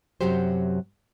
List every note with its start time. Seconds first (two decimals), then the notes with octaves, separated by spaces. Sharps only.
0.21 F#2 C3 F#3 F#4 G4 C5